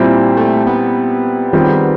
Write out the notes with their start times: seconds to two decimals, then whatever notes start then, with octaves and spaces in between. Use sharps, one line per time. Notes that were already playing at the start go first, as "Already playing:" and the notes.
Already playing: A#2 G3 C4 E4
0.37 A3
0.67 B3
1.53 D#3 G3 C4 F4 G#4